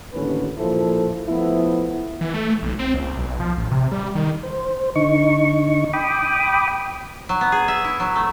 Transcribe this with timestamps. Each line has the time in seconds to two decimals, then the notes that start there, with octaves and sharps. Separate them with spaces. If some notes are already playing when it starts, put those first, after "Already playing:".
0.14 A1 D#2 D3 E3 C#4 B4
0.59 A1 A#2 F3 E4 A4 C5
1.27 F3 A3 B3 E4
2.21 E3
2.34 A3
2.63 B1
2.79 C4
2.94 C#2
3.17 B1
3.40 F3
3.58 A1
3.71 C3
3.92 G3
4.15 D#3
4.43 C5
4.96 D3 D#4 C#6
5.93 G5 B5 D6 D#6
7.29 F#3
7.41 B3
7.52 G#4
7.68 E5
7.84 E4
8.00 F#3
8.16 A3